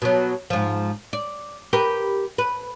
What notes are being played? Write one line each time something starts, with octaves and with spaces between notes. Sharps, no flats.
B2 F#3
G#2 F3
D5
G4 A#4 B4
B4